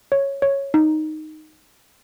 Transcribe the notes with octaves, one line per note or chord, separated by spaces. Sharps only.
C#5
C#5
D#4